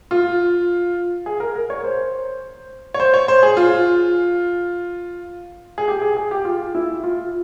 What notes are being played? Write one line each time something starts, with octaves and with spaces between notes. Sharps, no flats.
F4
G#4
A#4
A#4
C#5
C5
C#5
C5
C#5
C5
G#4
F4
G#4
G4
G#4
G#4
G4
F4
E4
F4